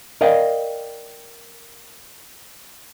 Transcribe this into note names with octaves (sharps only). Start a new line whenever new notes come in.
A#4 D5 D#5 F5 G5